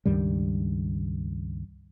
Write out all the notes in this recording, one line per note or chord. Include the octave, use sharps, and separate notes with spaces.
C#2 G2 D#3 G3